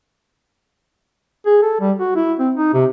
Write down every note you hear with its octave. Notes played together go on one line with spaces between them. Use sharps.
G#4
A4
G3
F#4
E4
C4
D#4
C3